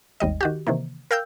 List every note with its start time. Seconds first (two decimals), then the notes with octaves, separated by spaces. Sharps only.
0.20 G#1 D#2 G3 D#5
0.41 D#3 F#4 G4
0.67 C3 D#3 E3 A#3
1.11 A#4 F5 G5 E6 G6